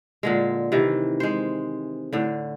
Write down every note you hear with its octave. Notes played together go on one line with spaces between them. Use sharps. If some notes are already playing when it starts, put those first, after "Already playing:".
A#2 D3 G#3
C3 D#3 E3
G#3 C5
A2 D3